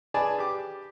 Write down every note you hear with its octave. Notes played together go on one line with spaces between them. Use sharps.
G#4 B4 D5 G#5 A5
G4 D6